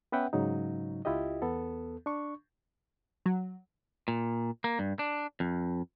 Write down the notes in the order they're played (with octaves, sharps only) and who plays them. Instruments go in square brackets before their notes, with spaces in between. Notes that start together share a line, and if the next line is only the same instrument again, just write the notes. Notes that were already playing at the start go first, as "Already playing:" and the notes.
[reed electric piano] B3 C#4 B4 E5 F#5 G5
G#2 C#3 F#3 D#4
C#2 E4 F4 G4 D#5
E2 B3 A4
D4 C#6
[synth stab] F#3
[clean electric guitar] A#2
A#3
G2
D4
F2